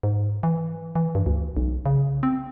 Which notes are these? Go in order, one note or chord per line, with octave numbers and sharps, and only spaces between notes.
G#2
E3
E3
G2
D2
B1
C#3
C4